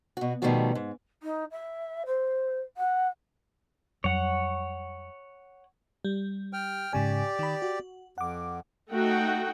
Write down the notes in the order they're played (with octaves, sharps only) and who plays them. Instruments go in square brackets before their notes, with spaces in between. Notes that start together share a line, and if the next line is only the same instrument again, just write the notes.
[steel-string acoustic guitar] B2 F#4
B2 D#3 F3 G3 A3 F#4
G#2
[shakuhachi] D#4
E5
C5
F#5
[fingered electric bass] F2 F#3 G3 [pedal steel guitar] C#5 F#5
[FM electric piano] G3
[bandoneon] G5 F6
[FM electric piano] G#2 C#3 G#5 [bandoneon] G4 D5
[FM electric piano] D#3 B5
F#4
[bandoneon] F2 [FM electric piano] F#5 D6
[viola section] A3 D#4 F#4 F#5 G5